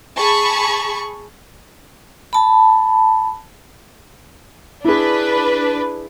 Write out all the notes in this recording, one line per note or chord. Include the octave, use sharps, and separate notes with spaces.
G#4 A5 B5 C#6
A5 B5
D4 E4 G#4 B4